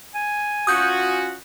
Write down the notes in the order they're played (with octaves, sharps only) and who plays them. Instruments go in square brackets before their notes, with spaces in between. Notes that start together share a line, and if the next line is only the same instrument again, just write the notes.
[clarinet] G#5
[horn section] C#4 F4 F#4 [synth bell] D#6 G6